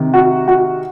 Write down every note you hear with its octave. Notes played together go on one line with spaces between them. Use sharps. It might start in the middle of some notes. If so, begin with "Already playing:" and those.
Already playing: C3 D#3
F#4
F#4